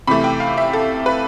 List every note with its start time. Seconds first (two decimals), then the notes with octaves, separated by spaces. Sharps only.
0.07 C3 E3 A3 B5
0.24 G5
0.40 F5
0.58 E5
0.73 A4
1.06 B4